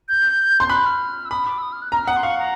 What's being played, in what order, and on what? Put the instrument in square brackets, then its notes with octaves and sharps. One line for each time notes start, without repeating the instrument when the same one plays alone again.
[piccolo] G6
[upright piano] C6
[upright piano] B5 [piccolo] F#6
[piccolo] F6
E6
[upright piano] B5 [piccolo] D#6
[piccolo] D6
E6
D#6
F6
F#6
[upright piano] A#5 [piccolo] F6
[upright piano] F#5 [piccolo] D#6
[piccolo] C6
[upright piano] F5 [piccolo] C#6
[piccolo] A#5